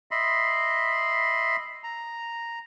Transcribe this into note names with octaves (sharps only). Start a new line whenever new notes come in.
D#5 E5 B5 C6
A#5